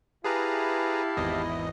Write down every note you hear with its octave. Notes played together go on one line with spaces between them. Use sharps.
E4 G4 G#4 B4 F5 A5 A#5
G#1 E2 D#5